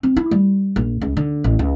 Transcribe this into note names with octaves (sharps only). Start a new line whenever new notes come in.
C4
E4
G3
A#1
C#2
D3
A1
C#2